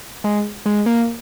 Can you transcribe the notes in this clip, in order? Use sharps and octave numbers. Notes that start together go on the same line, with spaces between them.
G#3
G#3
A#3